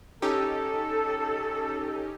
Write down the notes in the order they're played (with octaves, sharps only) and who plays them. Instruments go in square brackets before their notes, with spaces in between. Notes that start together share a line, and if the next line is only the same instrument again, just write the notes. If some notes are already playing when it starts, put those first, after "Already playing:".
[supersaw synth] C#4 D#4 G4 [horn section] A4